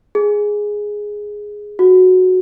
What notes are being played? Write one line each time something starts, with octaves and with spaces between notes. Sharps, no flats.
G#4
F#4